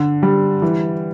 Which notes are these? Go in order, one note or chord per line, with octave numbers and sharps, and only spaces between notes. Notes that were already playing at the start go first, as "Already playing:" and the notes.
Already playing: D3
G3
E3